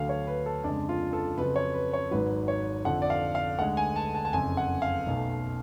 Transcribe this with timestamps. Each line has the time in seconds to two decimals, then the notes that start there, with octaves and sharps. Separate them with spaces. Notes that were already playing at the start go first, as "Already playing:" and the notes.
Already playing: D2 D3 F#3 F5
0.09 C#5
0.27 B4
0.46 A4
0.64 F2 C#3 G#3 D4
0.89 F4
1.13 A4
1.38 F2 C#3 F#3 B4
1.56 C#5
1.74 B4
1.93 C#5
2.11 G#1 G#2 F#3 B4
2.48 C#5
2.85 F2 D3 F3 F#5
3.02 D5
3.10 F5
3.35 F5
3.59 D2 D3 G#3 F#5
3.77 G#5
3.96 A5
4.15 A5
4.25 A5
4.33 F#1 F2 C#3 G#5
4.57 F#5
4.82 F5
5.06 B1 B2 A3